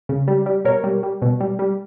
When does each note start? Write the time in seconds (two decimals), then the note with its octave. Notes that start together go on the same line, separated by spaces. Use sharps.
0.09 C#3
0.28 G3
0.46 G3
0.65 B2 A#4 C#5
0.84 G3
1.03 G3
1.22 B2
1.40 G3
1.59 G3